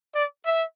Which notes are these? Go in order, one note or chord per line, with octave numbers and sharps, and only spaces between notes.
D5
E5